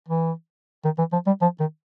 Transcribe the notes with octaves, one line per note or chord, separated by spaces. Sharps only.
E3
D#3
E3
F3
G3
F3
D#3